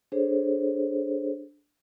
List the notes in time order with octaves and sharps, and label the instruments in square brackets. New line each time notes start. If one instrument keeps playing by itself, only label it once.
[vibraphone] D4 G#4 A4 C5 C#5